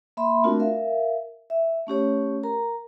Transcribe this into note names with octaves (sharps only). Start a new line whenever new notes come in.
A#3 E5 B5 C6
A3 C4 D4 F4 F#4 A#4
A#4 E5 F5
E5
A3 C#4 G4 C#5
A#4 A#5